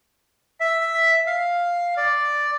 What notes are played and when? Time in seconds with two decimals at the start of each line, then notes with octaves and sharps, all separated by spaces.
0.60 E5
1.27 F5
1.97 D5